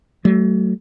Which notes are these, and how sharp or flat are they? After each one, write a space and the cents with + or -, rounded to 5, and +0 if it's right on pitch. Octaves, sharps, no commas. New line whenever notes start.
F#3 +35 A3 +0